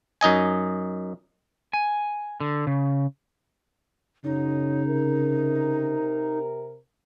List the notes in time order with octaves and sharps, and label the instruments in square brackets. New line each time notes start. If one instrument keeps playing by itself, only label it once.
[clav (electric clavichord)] F#2 D#4 D#5 G#5
[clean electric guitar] G#5
D3
C#3
[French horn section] F#2 C#5 [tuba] C#3 [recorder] D#4
[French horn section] C3 A#4